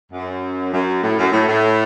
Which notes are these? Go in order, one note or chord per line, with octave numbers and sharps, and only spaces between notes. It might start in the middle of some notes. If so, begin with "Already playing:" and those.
F#2
F#2
A2
F#2
A2
A2